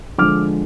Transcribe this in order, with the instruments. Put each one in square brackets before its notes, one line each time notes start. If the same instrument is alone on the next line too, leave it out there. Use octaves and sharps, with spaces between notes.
[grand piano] D3 F3 G#3 D6 F6